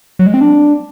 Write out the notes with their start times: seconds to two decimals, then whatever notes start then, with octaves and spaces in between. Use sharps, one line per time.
0.19 F#3
0.27 G#3
0.34 C4
0.41 D4